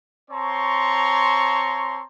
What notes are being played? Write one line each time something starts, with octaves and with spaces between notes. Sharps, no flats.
C4 C#5 A5 A#5 C6 C#6